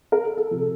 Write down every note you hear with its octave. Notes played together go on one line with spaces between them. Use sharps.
A#4
A4
A4
C3 F3